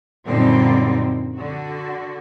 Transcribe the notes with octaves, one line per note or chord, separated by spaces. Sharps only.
F#2 A#2 D3 G3 C4 D#4
D3 F#4